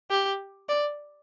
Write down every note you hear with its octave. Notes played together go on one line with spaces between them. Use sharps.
G4
D5